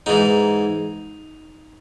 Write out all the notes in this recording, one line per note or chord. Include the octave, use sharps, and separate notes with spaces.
G#2 E3 D#4